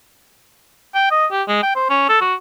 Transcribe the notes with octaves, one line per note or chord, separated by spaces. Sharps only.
G5
D#5
G4
G#3
G5
C5
C#4
A4
F#4